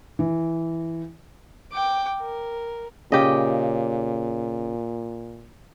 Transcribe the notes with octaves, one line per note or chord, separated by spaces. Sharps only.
E3
G5 D6
A#4
A#2 C#3 G4 D#5